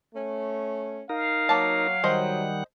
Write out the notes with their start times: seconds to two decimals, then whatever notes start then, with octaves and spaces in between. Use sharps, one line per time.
0.14 A3 C#4
1.09 D#4 A#4 F5
1.49 F#3 A#3 A5
2.04 D#3 G3 C5 D#5 F#5